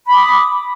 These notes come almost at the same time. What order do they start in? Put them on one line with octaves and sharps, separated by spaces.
B5 D6 D#6